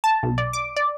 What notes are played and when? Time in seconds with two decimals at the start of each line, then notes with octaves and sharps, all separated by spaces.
0.04 A5
0.23 B1
0.38 D5
0.53 D6
0.76 D5